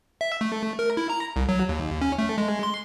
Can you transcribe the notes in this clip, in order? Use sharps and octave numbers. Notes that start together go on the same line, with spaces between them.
E5
A3
A#4
E4
A#5
C2
F#3
D#2
C#4
A3
G#3
C6